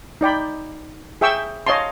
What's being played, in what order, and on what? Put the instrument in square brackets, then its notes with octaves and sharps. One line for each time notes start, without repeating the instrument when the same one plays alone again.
[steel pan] D#4 D5 G5 B5
G#4 E5 G5 C#6 E6
C#5 D#5 F5 A5 C6